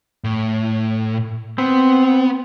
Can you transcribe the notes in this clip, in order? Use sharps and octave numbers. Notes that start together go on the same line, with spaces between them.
A2
B3 C4